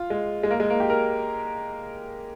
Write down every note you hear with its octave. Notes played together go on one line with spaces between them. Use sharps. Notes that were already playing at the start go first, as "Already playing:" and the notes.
Already playing: F4
G#3
G#3
A#3
G#3
A#3
G4
A#4